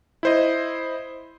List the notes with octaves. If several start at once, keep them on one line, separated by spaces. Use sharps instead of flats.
E4 C5 D#5